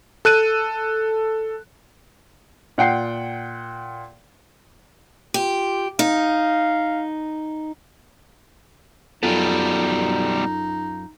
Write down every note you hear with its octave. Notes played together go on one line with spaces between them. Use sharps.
A4 F#6 D#7
A#2 F#5 G5 C7
F4 G4
D#4 F5
F#2 B2 G3 D#4 F4 A4